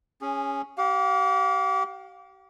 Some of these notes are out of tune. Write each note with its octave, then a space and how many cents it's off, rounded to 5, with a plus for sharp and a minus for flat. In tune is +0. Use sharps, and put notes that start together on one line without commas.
C#4 +0 G#4 -20
G4 -35 F5 +25